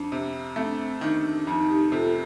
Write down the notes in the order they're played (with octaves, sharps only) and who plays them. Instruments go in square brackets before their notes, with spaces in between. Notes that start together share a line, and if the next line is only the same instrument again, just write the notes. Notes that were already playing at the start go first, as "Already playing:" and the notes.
Already playing: [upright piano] F2 [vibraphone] D4
[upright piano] C3
[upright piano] A3 [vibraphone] C4
[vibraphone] D4
C4
[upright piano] D#3 [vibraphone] D4
[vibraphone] D4
[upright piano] F2 [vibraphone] D#4
[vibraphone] D#4 G4
[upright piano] C3 [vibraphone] F4 A4